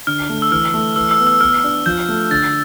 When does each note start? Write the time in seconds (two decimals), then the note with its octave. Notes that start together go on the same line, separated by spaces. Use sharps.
0.07 D3 F6
0.30 A3
0.42 E6
0.51 E3 F6
0.74 A3
0.96 E3 E6
1.11 E6
1.19 B3
1.27 E6
1.41 B3 F6
1.64 D4
1.86 F3 G6
2.09 A3
2.31 D3 A6